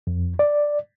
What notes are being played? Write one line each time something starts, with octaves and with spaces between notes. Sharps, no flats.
F2
D5